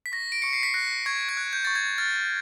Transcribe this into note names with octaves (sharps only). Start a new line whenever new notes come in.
B6
C#6 A#6
D7
C#6 C#7
C7
B6
F#6 A#6
C#6 G#6
G#6
F#6
G6
C#6 A6
G#6
F6 A6